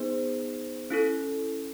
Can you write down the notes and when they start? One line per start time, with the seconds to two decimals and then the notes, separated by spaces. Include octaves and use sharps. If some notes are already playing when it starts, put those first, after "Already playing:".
Already playing: B3 D#4 G#4 C5
0.90 C#4 E4 A4